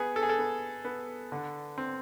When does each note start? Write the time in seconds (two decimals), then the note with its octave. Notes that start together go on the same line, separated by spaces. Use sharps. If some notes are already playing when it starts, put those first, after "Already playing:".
Already playing: B3 G#4
0.16 A4
0.23 G#4
0.29 A4
0.39 B3
0.85 B3
1.32 D3
1.78 C4